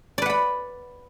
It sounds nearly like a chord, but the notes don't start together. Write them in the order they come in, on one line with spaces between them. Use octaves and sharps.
D5 B4 F#5 B5